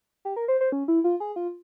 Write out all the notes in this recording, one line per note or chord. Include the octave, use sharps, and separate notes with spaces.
G4
A#4
C5
C5
C#4
E4
F4
G#4
F4